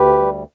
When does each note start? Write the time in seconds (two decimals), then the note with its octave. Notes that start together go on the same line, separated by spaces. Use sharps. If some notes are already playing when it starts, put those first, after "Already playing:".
Already playing: D2 G4 B4
0.19 G3